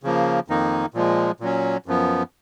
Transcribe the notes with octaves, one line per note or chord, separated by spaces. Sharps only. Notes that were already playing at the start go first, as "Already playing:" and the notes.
C#3 F3 A#3
F2 D#3 A#3 D#4
A#2 F3 G#3
A#2 F#3 C#4
F#2 F3 B3